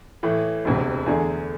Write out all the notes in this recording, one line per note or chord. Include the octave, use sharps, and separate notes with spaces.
A2 E3 A3
E1 D2 C3
E2 D3 A3 D4 G#4